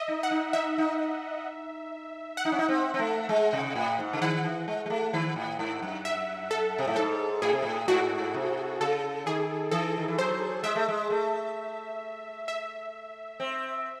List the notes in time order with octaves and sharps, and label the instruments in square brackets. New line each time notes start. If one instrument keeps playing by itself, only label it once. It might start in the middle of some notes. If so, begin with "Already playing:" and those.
Already playing: [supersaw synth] D#5 E5
[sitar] D#4
[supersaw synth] F#5
[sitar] D#4
[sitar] D#4 [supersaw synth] E5
[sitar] D#4
[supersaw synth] F#5
[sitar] D#4
C#4
D#4
C4
C4
A3
G#3
C3
A2
G#2
C#3
[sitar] D#3 [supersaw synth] F#5
[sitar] E3
G#3
G#3
A3
D#3
A2
G#2
F#2
[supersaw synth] E5
A4
[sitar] C3
A2
[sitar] G#2 [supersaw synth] A4
[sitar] A2 [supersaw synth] G#4
[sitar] C3
A2
[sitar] G#2 [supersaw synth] F#4
[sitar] C3
[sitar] C#3 [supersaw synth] A4
[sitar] D#3 [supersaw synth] G#4
[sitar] E3 [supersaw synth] A4
[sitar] D#3
E3
[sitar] F#3 [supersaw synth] C5
[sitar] G#3 [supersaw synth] E5
[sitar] A3
G#3
A3
[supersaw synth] E5
[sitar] C4